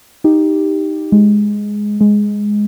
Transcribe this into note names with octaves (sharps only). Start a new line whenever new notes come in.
D#4 G4
G#3
G#3